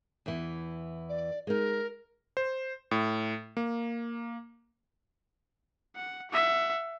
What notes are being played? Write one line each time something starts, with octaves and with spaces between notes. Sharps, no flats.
E2 E3
D5
G#3 D#4 A#4
C5
A2
A#3
F#5
E5 F#5